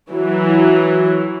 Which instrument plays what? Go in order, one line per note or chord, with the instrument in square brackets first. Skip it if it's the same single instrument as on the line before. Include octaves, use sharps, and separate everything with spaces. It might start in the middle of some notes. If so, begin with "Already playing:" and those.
[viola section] E3 F#3